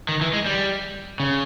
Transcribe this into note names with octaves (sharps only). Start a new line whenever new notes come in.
D#3
E3
G#3
G3
C#3